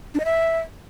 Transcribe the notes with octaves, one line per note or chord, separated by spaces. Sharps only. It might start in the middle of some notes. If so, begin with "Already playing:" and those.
D4
D#5
E5